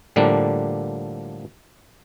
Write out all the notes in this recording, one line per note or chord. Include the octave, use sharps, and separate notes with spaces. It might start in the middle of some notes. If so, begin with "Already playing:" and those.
A2 D3 F3 G3 A#3 D4